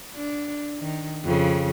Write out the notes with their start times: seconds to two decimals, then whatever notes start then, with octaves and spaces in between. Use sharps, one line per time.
0.15 D4
0.80 D#3
1.24 F2 C#3